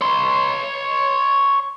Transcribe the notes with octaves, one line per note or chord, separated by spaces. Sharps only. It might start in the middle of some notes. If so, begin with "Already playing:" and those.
C#5 C6